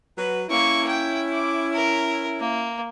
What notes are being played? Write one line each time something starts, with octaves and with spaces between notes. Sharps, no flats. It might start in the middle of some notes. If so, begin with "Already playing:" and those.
F#3 F#4 B4
A#3 C#4 E4 C#6
G5
D6
A#4
A#3